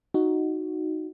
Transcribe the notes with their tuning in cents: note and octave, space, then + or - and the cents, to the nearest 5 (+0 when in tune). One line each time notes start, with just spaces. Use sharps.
D#4 +0 F#4 +0